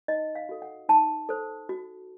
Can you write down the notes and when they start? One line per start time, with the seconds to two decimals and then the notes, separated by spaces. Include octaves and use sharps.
0.08 D#4 D#5
0.35 F5
0.49 F#4 A4
0.62 F#5
0.89 D#4 A5
1.29 A4 C5
1.69 F#4